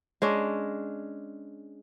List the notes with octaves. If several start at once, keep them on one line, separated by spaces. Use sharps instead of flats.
G#3 C#4 D4